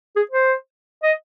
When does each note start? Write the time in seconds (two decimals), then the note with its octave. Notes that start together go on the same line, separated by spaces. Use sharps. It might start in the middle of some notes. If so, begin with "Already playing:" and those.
0.16 G#4
0.31 C5
1.03 D#5